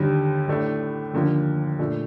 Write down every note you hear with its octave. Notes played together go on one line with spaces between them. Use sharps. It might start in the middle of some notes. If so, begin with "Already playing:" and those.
Already playing: D#2 D3 G3
A2 A3 D4
D#2 D3 F3 A#3
A#2 A3 D4